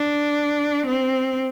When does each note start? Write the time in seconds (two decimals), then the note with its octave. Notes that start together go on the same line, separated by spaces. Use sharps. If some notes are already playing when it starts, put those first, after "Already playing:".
Already playing: D4
0.86 C4